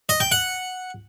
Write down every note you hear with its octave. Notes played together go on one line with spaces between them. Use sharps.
D#5
G5
F#5